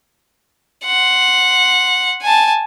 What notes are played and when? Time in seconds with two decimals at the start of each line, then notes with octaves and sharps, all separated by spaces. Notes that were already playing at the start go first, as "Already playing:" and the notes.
0.85 F#5 C6
2.22 G#5 A5